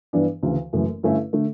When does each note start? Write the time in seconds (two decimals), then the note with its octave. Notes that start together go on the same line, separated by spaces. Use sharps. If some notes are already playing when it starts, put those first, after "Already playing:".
0.13 G2 E3 B3 D4
0.43 D2 C#3 E3
0.73 F#1 F#2 E3 A3
1.03 G2 D3 A3 C#4 E4
1.33 D3 A3